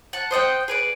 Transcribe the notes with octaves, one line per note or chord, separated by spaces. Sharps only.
F#5 A5
C5 D#5 F#5 G5
G#4 B4 D5